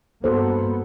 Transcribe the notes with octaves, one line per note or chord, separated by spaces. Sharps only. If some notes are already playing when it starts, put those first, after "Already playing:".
G2 A#3 B3 F#4 A4 C5